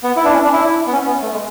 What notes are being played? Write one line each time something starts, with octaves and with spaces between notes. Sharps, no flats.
B3
E4
D4
C#4
D4
E4
B3
C#4
B3
A3
G#3